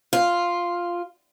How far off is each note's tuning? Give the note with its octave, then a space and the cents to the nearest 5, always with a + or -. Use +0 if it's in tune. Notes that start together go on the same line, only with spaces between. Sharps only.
F4 +0 F5 +0